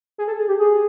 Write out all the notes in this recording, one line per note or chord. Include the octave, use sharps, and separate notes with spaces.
G#4
A4
G#4
G4
G#4